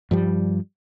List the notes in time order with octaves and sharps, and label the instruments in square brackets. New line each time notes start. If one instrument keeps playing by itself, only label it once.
[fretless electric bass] G2 F3 G3